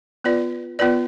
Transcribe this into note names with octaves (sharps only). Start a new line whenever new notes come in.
B3 F4 B4 D5
B3 F4 B4 D5